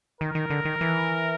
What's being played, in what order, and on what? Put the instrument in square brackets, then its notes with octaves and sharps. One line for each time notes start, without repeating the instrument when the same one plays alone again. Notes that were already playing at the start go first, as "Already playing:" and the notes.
[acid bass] D#3 [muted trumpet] A#4
[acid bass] D#3
D3
D#3
E3